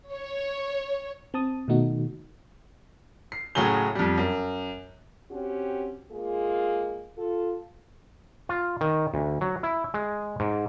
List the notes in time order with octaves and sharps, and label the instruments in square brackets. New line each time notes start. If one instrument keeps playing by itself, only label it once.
[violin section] C#5
[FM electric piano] C4 A5 D#6
B2 D#3 A3 D#4 F#4
[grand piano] C7
A2 C#3 F#3 G#4 G7
F2 G3
F#2
[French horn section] C4 C#4 F#4 G4
G#3 A#3 F4 G#4
F4 A4
[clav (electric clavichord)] F4
D#3
D2
F#3
E4
G#3
G#2